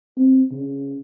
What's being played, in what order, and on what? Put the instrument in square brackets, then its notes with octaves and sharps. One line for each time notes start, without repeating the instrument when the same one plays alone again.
[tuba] C4
C#3